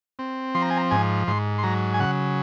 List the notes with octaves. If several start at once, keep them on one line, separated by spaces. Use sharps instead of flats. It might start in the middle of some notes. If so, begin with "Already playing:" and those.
C4
F3 C6
A#5
G#5
A#5
G#2 G#5
G#2 C6
C6
F#3 A#5
G#5
C#3 F#5